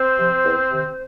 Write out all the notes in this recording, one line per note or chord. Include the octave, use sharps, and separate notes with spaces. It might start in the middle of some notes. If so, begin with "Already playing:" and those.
Already playing: C4 C5
C3 F3
E2
C3 D#3